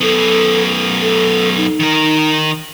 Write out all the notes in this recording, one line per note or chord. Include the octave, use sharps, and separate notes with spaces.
F#2 B3 A4
A4
D#4
D#3 A#4